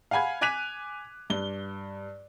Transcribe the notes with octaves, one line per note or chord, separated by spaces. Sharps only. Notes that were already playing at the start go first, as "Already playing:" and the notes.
F5 F#5 G#5 B5 G#6
G#5 D6 F#6 B6 D#7 F7
G2 G7